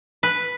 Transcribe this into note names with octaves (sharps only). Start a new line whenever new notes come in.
B4